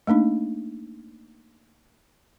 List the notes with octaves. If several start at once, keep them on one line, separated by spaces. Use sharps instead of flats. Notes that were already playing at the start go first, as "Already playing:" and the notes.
A3 A#3 D4 D#4